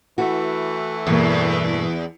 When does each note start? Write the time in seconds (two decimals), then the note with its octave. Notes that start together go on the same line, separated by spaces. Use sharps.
0.18 E3 A3 F#4
1.07 E2 G2 B2 A#3